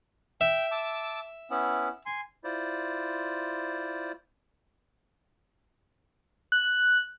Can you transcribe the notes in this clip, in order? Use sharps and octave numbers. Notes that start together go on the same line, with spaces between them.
E5 G5
A5 D6 E6
B3 C#4 E4
G#5 C6
E4 F4 C5 D5
F#6